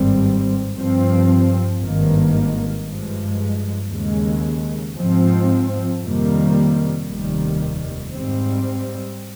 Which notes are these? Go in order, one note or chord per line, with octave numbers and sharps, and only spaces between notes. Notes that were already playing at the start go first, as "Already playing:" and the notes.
Already playing: G#1 G2 G3 C4
G2 F3 C4
G#1 G2 D#3 A#3
G2 F3 G#3
D#2 C#3 G#3
G#2 F3 C4
F2 C3 D#3 G3 A#3
F1 D#2 D#3 G3
G#2 G3 C4